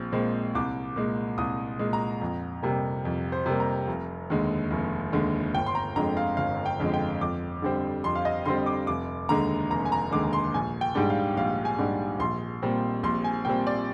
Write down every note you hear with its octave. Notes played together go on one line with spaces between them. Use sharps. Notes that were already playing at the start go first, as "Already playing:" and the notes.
Already playing: A#1 A#2 C4
A#2 G#3 C4
C2 D6
A#2 G#3
C2 D#6
A#2 G#3
A#5
F2
C3 G3 A#3
F2
C5
C3 G3 A#3
A#5
F1
D#2 D3 G#3
F1
D#2 D3 G#3
G1 G5
C6
A#5
F2 D3 G#3 A#5
F5
G1 F5
G5
F2 D3 G#3
G5
F2 D6
D3 G3 C4
F2 C6
F5
D#5
D3 G3 C4 C6
D6
F1 D6
D#2 D3 G#3 A#5
F1 A#5
G#5
A#5
D#2 D3 G#3 D6
C6
A#1 G#5
G5
G#2 G3 D4
F5
A#1 F5
G#5
G#2 G3 D4
A#1 C6
A#2 G3 C4
A#1 C6
G#5
A#2 G3 C4 G5
D5